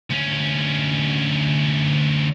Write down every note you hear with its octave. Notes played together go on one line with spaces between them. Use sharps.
D2 C#4